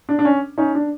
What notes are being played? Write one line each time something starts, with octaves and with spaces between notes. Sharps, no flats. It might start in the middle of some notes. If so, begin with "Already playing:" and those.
D4
D4
C#4
C#4 D#4
D4